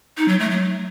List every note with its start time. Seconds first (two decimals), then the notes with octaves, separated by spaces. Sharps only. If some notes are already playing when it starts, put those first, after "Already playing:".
0.17 D#4
0.28 F#3
0.39 A3
0.50 F#3